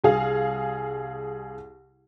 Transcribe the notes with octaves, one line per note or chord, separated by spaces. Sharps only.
C2 G#4 F5